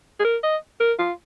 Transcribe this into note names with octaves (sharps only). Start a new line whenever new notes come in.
G#4
A#4
D#5
A#4
F4